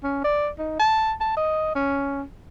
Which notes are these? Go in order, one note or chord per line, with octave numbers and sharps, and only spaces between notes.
C#4
D5
D#4
A5
A5
D#5
C#4